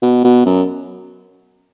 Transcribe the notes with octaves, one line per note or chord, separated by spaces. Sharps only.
B2
B2
F#2